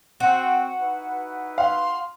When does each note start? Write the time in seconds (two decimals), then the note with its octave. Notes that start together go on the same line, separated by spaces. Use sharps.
0.20 C4 F#4
0.79 D#4 E4 B4
1.58 F5 C6